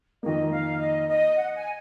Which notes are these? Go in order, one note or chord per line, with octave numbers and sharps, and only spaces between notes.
F2 D#3 A#3 D#5
F5
D#5
D#5
F#5
G#5